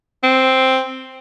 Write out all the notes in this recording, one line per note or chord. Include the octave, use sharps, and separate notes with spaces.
C4